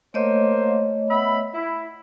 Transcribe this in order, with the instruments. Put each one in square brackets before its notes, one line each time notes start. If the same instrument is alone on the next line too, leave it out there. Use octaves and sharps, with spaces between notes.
[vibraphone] A3 C#5 D#5 [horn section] A#3 C5
[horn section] B3 E5 B5
E4